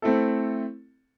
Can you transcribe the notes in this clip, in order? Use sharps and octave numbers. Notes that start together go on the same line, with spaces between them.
A3 C4 E4 A4